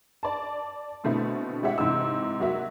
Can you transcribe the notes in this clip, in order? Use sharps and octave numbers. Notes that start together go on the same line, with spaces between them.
D5 A5
B2 D3 A3 C4 E4
G#3 G4 C#5 E5 F#5
G#2 C3 E3 E6
F#3 A#3 F#4 E5